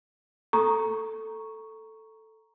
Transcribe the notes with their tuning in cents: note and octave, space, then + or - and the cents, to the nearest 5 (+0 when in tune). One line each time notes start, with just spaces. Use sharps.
A4 +0 A#5 +5 C#6 +0